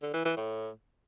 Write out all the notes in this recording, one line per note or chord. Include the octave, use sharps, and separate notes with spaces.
D3
E3
E3
A2